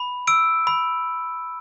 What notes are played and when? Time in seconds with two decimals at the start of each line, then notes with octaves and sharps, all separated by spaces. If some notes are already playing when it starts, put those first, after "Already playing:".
Already playing: B5
0.27 E6 D7
0.67 B5